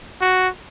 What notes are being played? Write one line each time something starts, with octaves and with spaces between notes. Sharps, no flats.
F#4